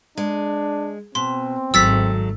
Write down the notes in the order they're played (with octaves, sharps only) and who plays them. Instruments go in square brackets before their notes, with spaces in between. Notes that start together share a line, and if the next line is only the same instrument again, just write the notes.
[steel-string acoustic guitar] G#3 [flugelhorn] D4
[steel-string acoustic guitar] B2 [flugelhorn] C4 [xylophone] C6
[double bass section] G#1 [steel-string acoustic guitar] F#3 A3 [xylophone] E6 A6 B6